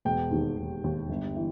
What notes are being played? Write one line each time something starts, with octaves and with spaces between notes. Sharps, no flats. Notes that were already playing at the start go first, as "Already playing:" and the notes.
E1 G5
D#2 D#3
E1
D#2 D#3
G1
E3